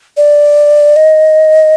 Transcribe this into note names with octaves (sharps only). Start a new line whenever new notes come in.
D5
D#5